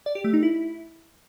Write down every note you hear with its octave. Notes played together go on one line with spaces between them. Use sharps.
D5
G4
A3
D#4
E4